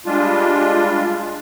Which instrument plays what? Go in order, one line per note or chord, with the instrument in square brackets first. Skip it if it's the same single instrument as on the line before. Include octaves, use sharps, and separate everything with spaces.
[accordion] G3 G#3 D4 F4